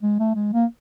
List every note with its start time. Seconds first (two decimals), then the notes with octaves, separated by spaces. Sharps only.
0.03 G#3
0.19 A3
0.35 G#3
0.53 A#3